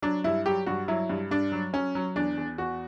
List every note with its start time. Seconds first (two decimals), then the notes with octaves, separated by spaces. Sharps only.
0.02 F#3 D4
0.24 G2 E4
0.46 F#3 G4
0.66 G2 F#4
0.88 F#3 E4
1.09 G2
1.31 G2 D4
1.52 F#3
1.73 F#3 C#4
1.95 F#3
2.16 E2 D4
2.37 E2
2.58 E2 F#4